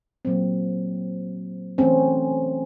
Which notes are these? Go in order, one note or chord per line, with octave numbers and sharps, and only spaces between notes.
A#2 F#3 A#3 C4
E3 A3 C4 C#4